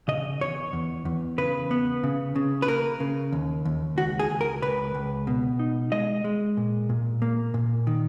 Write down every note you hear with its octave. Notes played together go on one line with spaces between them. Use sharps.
C#3 D#5
E2 C#5
E2
E2
C#3 B4
B3
C#3
C#3
B4
A#3 A#4
C#3
D#2
D#2
C#2 F#4
G#4
C#2
A#4
C#2 B4
C#2
B2
D#4
G#3 D#5
G#3
A#2
A#2
A#3
A#2
D#3